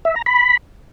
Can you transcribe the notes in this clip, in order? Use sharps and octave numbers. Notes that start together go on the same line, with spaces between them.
E5
A#5
B5